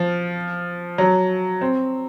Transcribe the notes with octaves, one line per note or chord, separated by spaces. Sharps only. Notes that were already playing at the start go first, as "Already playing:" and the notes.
Already playing: F3
F#3
C4